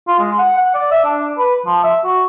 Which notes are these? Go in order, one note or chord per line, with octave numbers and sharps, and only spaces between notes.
F4
G#3
F#5
F#5
D5
E5
D4
B4
F3
E5
F#4